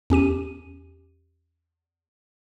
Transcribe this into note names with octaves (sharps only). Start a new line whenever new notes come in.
E2 C#4 G4 D#7